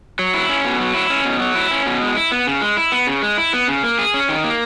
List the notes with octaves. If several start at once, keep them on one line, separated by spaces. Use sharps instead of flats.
F#3
E4
C#4
B2
F#3
E4
C#4
B2
F#3
E4
C#4
B2
G#3
E4
B3
C#3
G#3
E4
B3
C#3
G#3
E4
B3
C#3
A#3
G#4
C#4
D#3
A#3